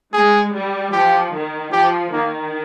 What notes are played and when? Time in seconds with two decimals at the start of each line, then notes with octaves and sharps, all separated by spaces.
0.13 G#3 G#4
0.53 G3
0.92 F3 G4
1.33 D#3
1.72 F3 G4
2.12 D#3 A#3